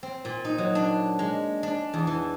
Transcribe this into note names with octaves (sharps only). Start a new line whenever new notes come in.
C4
A#2
D#4
F#3
D4
G#3
D4
E2
E3